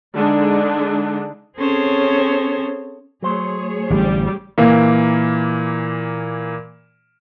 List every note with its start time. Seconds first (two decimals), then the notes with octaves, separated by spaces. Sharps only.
0.15 D3 G#3 D4 D#4
1.58 C4 C#4 G#4 A4 C5 C#5
3.22 F#3 A3 G#4 C5 C#5
3.90 A1 D3 G3
4.58 A#2 E3 A#3